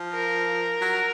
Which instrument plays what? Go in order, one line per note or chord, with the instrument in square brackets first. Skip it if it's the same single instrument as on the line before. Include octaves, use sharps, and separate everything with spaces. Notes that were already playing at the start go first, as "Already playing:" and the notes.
Already playing: [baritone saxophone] F3
[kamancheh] A#4
[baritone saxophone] F#3